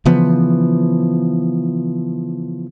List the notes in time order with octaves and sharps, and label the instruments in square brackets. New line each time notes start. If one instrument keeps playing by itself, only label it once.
[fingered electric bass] C#3 E3 F3 B3